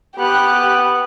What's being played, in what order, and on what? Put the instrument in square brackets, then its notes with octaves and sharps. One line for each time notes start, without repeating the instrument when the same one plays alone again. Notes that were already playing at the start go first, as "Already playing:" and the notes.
[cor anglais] B3 [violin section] G4 F#6